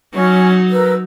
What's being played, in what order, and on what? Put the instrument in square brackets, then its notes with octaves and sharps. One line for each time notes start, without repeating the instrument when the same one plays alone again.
[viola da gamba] F#3 D#4 [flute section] C#4
[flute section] A#4 B4 E6